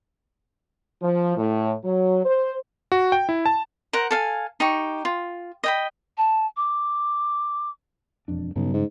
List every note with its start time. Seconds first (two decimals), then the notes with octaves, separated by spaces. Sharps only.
1.01 F3
1.36 A2
1.84 F#3
2.24 C5
2.92 F#4
3.12 G5
3.29 E4
3.46 A5
3.93 A#4 C5 F#5 A#5
4.11 A4 F5 G#5
4.60 D#4 G4 C#6
5.05 F4
5.64 D#5 G5 B5
6.18 A5
6.57 D6
8.28 E1 F2 D4
8.56 B1 G2 C#3
8.74 G#2